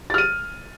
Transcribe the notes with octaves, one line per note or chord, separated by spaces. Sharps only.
F6 A6 D#7